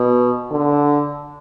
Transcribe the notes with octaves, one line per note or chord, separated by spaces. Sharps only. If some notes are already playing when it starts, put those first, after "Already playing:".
Already playing: B2
D3